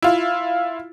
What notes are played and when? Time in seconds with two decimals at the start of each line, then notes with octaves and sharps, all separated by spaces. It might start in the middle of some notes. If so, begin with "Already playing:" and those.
0.02 E4 F4